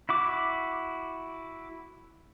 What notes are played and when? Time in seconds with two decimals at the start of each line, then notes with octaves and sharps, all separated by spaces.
0.09 E4 F#4 D6